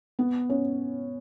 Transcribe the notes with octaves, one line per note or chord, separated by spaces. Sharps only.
B3
C#4